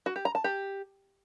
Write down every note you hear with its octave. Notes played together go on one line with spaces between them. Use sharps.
F#4
G4
A#5
A5
G4